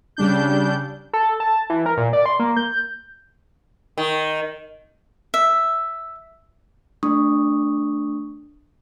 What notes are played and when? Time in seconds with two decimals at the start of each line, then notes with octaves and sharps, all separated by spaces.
0.17 C#3 G3 D4 G6
1.13 A4
1.40 A5
1.70 E3
1.86 A#4
1.98 A#2
2.13 D5
2.26 C6
2.40 A#3
2.56 G6
3.98 D#3
5.34 E5
7.03 A3 D4 C#6 D#6